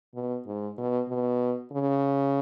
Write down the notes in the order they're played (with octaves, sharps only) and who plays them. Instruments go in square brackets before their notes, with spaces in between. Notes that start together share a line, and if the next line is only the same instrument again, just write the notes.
[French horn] B2
G#2
B2
B2
C#3